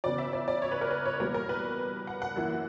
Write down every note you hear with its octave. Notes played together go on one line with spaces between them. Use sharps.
E2 C#3 F#3 B3 D5
E5
D5
D5
C#5
B4
A#4
B4
C#5
E2 B2 G3 A#3 A#4
A#4
B4
F#5
F#5
F#2 E3 A#3 E4